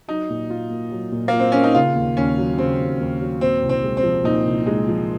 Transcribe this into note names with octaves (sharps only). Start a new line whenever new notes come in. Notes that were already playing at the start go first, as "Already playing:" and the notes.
F#3 D#4
A#2
F4
A#3
F#3
A#2
A#3
F4
C4
A#3 C#4
D#4
C#3 F4
D#2
D#2 C#4
F#3
C#3 C4
D#2
D#2
F#3
A#2 C4
C2
C4
G#3
C4
F3
A#2 D#4
C2
G#3 D#4
F3